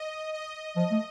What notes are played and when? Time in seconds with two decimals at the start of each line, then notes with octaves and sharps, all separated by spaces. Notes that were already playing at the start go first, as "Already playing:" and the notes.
Already playing: D#5
0.33 D#5
0.76 F3 D#5
0.91 A3